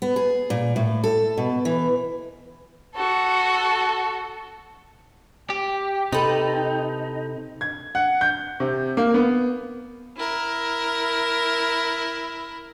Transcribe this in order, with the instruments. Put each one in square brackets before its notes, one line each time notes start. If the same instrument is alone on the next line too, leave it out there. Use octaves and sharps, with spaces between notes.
[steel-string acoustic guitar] B3
G#4
A#2
A2
A4
B2
E3
[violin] F#4 A4
[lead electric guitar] G4 [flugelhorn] G5
[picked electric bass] C3 [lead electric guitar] D#4 [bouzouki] A4 B4
[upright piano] G#6
F#5
G6
C3
A#3
B3
[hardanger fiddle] E4 A#4